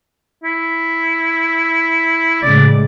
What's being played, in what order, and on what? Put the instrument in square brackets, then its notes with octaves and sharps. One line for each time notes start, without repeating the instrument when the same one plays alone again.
[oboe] E4
[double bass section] A2 C#3 G#3 [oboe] D5